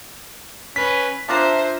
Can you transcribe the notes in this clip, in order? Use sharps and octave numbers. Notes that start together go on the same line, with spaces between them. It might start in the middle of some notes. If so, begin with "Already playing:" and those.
C#4 B4 B6
D4 F4 C5 E5 A#5